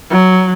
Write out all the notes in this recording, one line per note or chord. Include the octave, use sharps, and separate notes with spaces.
F#3